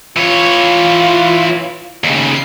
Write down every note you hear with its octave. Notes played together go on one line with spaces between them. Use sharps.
E3 F4 C#5
D#2 C#3